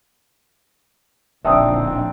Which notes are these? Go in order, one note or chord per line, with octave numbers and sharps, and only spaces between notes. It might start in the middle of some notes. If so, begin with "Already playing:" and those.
D1 A#1 C4 D4 D#4 E5 D#6